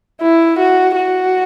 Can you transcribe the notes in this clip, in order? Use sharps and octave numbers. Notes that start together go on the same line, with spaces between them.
E4
F#4
F#4